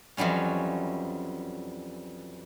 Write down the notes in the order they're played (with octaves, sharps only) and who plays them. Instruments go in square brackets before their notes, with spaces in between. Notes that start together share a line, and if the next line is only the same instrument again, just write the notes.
[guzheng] F2 E3 F#3 G3 C#4